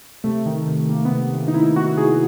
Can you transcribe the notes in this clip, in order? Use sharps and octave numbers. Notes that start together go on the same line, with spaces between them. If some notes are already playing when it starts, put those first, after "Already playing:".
C3 A3
D#3
C3
D#3 A#3
B3
C3
D#3
D#4
C3 E4
D#3 F#4
C3 G#4